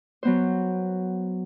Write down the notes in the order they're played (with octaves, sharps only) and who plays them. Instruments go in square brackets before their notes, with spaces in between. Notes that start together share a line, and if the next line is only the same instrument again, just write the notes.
[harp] F#3 B3 C5